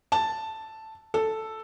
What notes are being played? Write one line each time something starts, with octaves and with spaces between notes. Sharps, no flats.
A5
A4